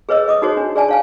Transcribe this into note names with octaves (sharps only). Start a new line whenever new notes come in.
G#4 B4 C#5 D#5 E6
D#5 D6 D#6
D#4 F#4 G#4 C5 C#5
D4
G#4 D5 G#5 A5
C#5 F5 G#5